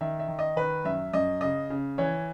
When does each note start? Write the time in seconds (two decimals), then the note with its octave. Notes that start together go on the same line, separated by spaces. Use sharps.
0.01 D#3 E5
0.19 E5
0.28 D#3
0.39 D#5
0.56 D#3 B4
0.84 F#2 E5
1.13 F#2 D#5
1.41 C#3 D#5
1.70 C#3
1.98 E3 C#5